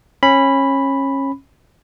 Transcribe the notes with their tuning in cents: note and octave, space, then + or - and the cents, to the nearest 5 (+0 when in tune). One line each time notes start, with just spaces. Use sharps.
C#4 -25 B5 +0